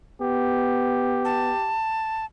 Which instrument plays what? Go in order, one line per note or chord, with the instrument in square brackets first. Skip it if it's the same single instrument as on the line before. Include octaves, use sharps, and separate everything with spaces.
[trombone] B3 [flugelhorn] G4
[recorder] A5